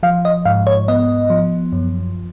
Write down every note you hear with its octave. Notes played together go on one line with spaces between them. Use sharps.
F3 F5
D#5
G#2 F5
C#5
B3 D#5
F3
F#2